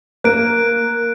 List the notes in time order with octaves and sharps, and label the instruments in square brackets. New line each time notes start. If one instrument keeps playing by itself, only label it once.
[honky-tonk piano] A#3 [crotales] F#6 D7